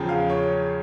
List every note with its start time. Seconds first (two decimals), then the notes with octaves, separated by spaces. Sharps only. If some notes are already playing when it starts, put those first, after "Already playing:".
Already playing: E2 C#3 F3 G5
0.09 F5
0.29 C#5